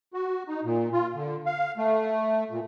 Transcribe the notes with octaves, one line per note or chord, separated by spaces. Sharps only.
F#4
D#4
A#2
F4
D3
F5
A3
A#2